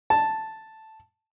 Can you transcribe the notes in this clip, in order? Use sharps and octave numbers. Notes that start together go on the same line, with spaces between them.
A5